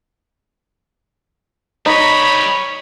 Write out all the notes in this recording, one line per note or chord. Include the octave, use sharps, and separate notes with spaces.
G3 D#4 C#5 D#5 B5